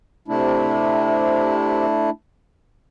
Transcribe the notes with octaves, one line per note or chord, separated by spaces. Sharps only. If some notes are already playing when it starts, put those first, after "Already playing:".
C3 A3 D4 E4